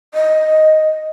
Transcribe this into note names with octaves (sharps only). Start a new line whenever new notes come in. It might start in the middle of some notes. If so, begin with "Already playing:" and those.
D#5